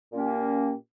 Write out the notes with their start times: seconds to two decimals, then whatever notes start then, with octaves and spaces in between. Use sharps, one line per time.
0.13 A#2 A#3 C#4 G4